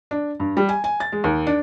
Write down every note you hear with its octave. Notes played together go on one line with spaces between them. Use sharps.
D4
G2
G3
G#5
G#5
A6
G#3
D#2
D4